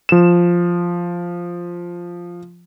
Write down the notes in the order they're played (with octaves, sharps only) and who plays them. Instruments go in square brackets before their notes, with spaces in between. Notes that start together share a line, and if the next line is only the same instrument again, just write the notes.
[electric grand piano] F3 E7